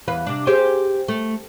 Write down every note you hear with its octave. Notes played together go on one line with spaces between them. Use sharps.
E2 B4 F5
C3 D4
G4 G#4 C5
A3